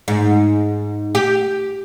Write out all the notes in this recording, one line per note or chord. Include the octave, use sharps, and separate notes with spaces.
G#2
G4